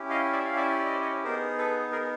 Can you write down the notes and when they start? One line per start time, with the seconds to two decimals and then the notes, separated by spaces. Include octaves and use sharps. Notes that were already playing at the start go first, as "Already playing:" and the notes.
Already playing: C#4 E4 G4
0.10 D#5 F5
0.32 D5 E5
0.45 F5
0.56 D5 E5
0.79 D5
0.86 D#5
0.93 C5 D5
1.01 C#5 D#5
1.24 B3 D#4 G#4 A#4 C5
1.58 A4 B4
1.92 G#4 A#4